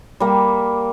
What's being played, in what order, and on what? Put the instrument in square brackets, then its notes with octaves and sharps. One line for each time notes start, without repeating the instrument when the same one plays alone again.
[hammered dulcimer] G3 A#3